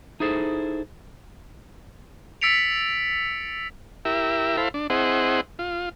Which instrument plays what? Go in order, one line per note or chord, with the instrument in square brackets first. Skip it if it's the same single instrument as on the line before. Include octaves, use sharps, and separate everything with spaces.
[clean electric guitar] D#4 E4 G#4 A4 C5
[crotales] E6 A6 B6 C#7 D7 F7
[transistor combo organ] E4 G4 A#4 E5
E4 A4 C5 F5 B5
D4
C4 E4 G#4 C5 D#5 F#5
F4